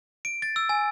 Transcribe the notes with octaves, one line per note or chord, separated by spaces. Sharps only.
D7
A6
E6
G#5